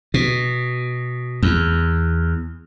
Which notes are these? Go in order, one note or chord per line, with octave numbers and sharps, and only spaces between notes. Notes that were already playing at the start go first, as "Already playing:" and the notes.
B2
E2